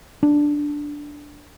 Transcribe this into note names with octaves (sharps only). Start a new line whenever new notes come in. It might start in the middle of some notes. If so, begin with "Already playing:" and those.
D4